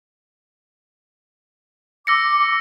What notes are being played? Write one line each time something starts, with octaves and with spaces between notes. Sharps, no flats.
D6 E6 A#6 C#7